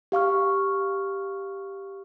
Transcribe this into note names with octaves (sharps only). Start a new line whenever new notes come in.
G4 F5 C#6 F6